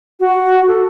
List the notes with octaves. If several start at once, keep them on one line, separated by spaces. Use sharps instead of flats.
F#4
A4